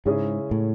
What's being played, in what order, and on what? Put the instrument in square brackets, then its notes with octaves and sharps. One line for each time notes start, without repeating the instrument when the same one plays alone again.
[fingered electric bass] G#2 [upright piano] C#3 G#3 C#4 E4 G#4
[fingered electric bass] A2